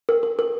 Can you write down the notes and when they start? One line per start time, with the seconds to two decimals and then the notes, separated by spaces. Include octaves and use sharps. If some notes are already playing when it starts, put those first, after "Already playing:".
0.09 A#4
0.23 A#4
0.39 A#4